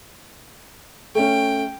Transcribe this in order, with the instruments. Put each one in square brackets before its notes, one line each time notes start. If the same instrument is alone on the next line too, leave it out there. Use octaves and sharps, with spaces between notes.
[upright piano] A3 C#4 [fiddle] G5